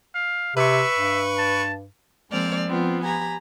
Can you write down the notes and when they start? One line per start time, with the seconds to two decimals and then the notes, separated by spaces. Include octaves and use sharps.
0.15 F5
0.57 C3 B4 E5 C#6
0.98 G2
1.38 A5
2.31 F3 G#3 A#3 C4 D5 F6
2.69 F3 B3 C4 F4
3.03 G4 G#5 A#5 B5